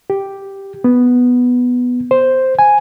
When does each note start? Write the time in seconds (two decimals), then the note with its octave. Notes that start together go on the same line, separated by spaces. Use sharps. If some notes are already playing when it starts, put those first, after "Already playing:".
0.10 G4
0.84 B3
2.11 C5
2.59 G#5